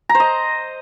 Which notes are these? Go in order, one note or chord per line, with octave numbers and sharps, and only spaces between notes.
A#5
C5
D#5